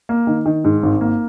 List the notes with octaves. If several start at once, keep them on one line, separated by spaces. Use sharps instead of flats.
A#3
D#3
D#3
G#2
G#1
A#3